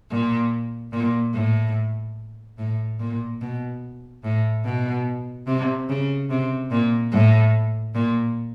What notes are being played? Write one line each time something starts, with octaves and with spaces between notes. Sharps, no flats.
A#2
A#2
A2
A2
A#2
B2
A2
B2
C3
C#3
C3
A#2
A2
A#2